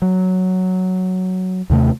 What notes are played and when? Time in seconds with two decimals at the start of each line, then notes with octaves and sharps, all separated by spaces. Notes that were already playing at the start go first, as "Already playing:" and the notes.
0.02 F#3
1.70 D#2 C3 A3